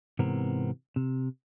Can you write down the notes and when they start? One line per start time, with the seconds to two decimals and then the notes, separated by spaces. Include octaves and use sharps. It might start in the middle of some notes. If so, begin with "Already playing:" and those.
0.19 G#2 C3 E3 B3 C4 A#4
0.96 C3